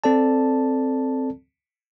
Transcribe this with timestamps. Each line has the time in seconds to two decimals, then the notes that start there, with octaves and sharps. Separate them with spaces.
0.04 C4 A4 D5 A5